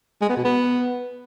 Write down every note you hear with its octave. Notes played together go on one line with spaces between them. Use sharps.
G#3
B3
B2
B3